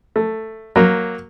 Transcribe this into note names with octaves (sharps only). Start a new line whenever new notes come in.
A3
F#3 A#3